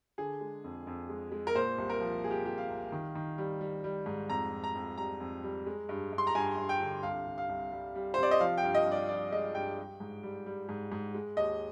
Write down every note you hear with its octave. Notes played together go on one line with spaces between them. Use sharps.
D3 G#4
G#3
F2
F2
G#3
G#3
A#4
A#2 C5
C2
A#4
F3
A#2 G#4
G4
C2 G4
F5
C2
D#3
D#3
G3
G3
G3
G#2
F2 A#5
F2
A#5
F2
G3 A#5
F2
G3
G#3
G2
G2
C6
A#5
G2 G#5
G2
G5
D3
C2 F5
C3
F5
C2
G3
G3
C5
C3 D5
D#5
F3 F5
G5
G2
D#5
G2
D5
F3 D5
G#3 D#5
G2 G5
G3
G#2
G3
G3
G#2
G#2
G#3
D#2 D#5